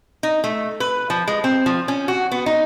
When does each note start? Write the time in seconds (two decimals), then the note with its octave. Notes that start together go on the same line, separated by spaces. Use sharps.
0.23 D#4
0.44 A3
0.80 B4
1.10 F3
1.28 G#3
1.44 C4
1.66 F3
1.88 C#4
2.08 F#4
2.31 B3
2.46 D#4